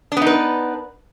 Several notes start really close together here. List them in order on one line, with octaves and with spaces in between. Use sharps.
D4 B3 D#4 B4